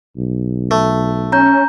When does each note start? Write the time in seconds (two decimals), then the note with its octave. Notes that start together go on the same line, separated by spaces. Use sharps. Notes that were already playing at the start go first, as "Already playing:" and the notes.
0.17 B1
0.71 A3
1.32 C#4 A#5 G6